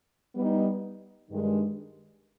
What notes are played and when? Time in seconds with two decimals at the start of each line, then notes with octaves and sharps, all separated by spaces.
0.34 G3 B3 D#4
1.29 G2 D#3 G#3